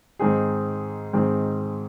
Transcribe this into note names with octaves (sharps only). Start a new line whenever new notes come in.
G#2 D#3 C4 G#4
G#2 D#3 C4 G#4